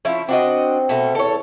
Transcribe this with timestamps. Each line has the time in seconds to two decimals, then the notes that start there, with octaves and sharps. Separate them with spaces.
0.05 F3 C#4 E4
0.29 C4 D4 F#4 D#5
0.89 B2 A3
1.15 E2 A4 C#5